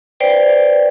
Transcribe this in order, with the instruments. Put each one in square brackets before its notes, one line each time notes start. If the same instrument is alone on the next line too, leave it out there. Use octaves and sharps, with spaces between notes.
[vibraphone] B4 C5 D5 G5